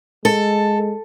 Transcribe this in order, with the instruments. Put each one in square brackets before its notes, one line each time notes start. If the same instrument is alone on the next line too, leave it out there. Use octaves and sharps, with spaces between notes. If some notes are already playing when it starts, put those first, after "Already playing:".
[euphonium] G#3 [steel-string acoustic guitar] A4